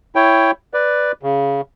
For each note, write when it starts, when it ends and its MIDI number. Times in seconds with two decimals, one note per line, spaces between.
0.15 0.51 64
0.15 0.51 73
0.15 0.51 79
0.74 1.12 71
0.74 1.12 74
1.23 1.61 49